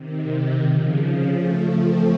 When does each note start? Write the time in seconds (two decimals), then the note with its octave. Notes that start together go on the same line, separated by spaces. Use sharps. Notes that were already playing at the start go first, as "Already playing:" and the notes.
Already playing: C3 D#3
0.65 C#3 F3
1.37 F3 A3
1.72 A3 C4